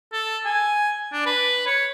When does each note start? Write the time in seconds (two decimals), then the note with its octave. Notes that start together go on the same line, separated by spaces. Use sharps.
0.13 A4
0.46 G#5
1.13 D4
1.26 B4
1.67 C#5